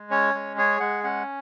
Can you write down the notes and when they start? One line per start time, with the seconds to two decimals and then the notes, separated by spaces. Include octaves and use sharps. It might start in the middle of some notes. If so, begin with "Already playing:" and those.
Already playing: G#3
0.10 C#4 C#5
0.34 G#3
0.57 G#4 C#5
0.80 G#3 F#5
1.04 C#4 F#5